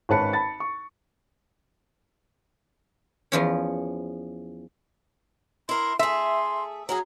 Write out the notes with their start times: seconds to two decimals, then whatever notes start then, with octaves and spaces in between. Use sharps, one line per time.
0.09 G#1 G#2 C#4 B4 A5 C#7
0.33 A5 B5 A6
0.60 C#6
3.32 E2 F3 C#4
5.69 E4 A#4 C6
5.99 A3 G#4 E5 C6
6.89 F#3 C#4 G#4 A#5